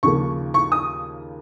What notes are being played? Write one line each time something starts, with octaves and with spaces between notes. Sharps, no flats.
D#2 C#3 F3 A#3 C#6
C#6
D#6